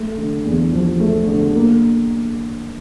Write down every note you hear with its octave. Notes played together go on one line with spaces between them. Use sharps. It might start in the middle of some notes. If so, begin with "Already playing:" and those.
Already playing: A3
D3
E2
F3
A3
D3
A#3